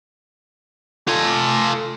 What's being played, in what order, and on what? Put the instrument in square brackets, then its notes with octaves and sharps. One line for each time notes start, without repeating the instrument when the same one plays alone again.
[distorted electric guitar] F4 G#5 [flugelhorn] A4